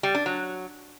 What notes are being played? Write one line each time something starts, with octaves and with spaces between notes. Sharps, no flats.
G3
D4
F#3